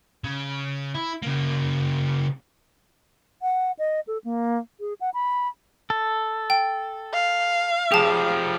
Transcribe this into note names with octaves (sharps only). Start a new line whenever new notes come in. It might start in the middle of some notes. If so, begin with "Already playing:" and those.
C#3
E4
C#3 A#3
F#5
D#5
A4
A#3
G#4
F#5
B5
A4
G5
F5
F3 G4 G#4 A5